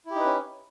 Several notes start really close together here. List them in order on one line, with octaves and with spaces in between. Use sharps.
E4 G4 D#4 B4 C#4